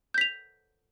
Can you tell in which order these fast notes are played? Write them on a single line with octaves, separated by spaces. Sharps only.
G6 B6 F7